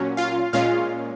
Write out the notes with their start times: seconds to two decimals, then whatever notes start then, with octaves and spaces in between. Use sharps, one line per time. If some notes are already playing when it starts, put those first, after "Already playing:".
Already playing: A#2 F#3 C#4
0.17 F4 F5
0.53 A#2 G#3 C#4 F4 F5